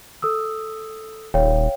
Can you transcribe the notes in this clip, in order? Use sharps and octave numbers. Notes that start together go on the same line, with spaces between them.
A4 D#6 E6
D#1 C#5 F5 G5